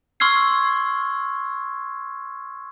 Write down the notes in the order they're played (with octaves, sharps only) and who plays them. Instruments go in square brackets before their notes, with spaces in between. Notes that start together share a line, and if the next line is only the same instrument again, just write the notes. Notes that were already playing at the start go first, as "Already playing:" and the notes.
[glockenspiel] C6 C#6 E6 F6 G#6 C7